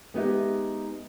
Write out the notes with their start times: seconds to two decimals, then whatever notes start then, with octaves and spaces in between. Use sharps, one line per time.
0.14 G#3 B3 D#4 G4 E5